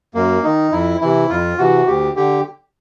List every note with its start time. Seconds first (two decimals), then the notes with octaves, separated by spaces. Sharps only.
0.14 F#2 A#3
0.43 D#3 D#4
0.72 F2 E4
1.01 C3 E3 E4
1.29 F2 F4
1.58 C3 E3 F#4
1.87 D2 G4
2.16 D3 G4